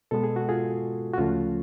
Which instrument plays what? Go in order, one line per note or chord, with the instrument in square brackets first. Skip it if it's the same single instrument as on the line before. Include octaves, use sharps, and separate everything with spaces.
[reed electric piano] B2 G#3 B3 A4
G#4
F#4
F4 G#4
F#4
D2 C#3 F3 A3 C#4 F4